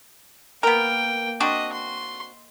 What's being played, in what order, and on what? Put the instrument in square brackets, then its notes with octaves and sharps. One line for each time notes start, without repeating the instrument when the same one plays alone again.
[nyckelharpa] A#3 G5 [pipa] B3 A#4
[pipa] C4 D4 F#4 [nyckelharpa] D#5
[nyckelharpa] C6